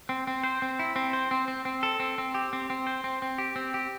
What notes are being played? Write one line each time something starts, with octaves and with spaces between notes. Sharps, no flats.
C4
C4
C5
C4
E4
C4
C5
C4
C4
C4
A4
C4
C4
G4
C4
C4
C5
C4
C4
G4
C4
G4